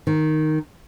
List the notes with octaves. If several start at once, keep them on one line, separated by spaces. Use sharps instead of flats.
D#3